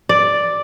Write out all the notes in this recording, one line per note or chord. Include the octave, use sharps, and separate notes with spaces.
D5